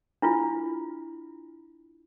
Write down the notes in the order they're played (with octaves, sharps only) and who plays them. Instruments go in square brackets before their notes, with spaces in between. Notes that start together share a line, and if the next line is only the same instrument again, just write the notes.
[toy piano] D4 E4 F4